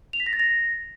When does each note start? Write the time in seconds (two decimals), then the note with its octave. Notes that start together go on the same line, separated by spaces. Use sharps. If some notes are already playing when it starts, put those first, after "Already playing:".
0.13 F7
0.20 B6
0.26 A#6
0.33 A6
0.40 A#6